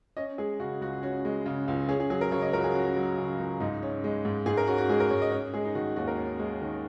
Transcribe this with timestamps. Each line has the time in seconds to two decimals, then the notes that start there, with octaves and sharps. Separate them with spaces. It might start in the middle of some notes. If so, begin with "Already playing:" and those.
0.17 C#4 D#5
0.38 G#3 G#4
0.60 C#3 F#4
0.81 C#2 F#4
1.03 C#4 F#4
1.25 G#3
1.46 C#3
1.68 C#2
1.89 C#4 G#4
2.00 G#4
2.10 F#3 G#4
2.21 A#4
2.32 C#3 C#5
2.42 D#5
2.53 C#2 A#4
2.59 F#4
2.64 G#4
2.74 C#4 F#4
2.96 F#3
3.18 C#3
3.39 C#2
3.60 G#2 D#4
3.83 C#4
4.04 G#3
4.25 G#2
4.46 G#2 G#4
4.57 A#4
4.67 C#4 F#4
4.78 F#4
4.89 G#3 G#4
5.00 A#4
5.11 G#2 C#5
5.22 D#5
5.32 C#4 C#5
5.54 G#3 G#4
5.65 D#4
5.75 D#3 F#4
5.96 D#2 F#4
6.07 A#4
6.17 C#4
6.39 G#3
6.62 D#3